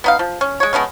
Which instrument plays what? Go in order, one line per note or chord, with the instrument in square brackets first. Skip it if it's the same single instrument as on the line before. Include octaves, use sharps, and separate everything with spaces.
[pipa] B3 D#4 F5
F3
C#4
G#3 C#5
G#3 A3 B3 C#4